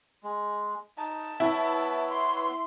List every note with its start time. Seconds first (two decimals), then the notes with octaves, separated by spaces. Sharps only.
0.23 G#3
0.98 D#4 A5
1.40 B3 E4 B4 C#5
2.09 C6